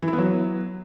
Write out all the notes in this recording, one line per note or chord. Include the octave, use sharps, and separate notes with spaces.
E3
E4
B3
F#3